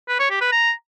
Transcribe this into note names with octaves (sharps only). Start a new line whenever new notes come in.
B4
C#5
G4
B4
A#5